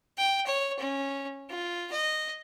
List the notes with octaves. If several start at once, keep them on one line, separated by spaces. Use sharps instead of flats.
G5
C#5
C#4
F4
D#5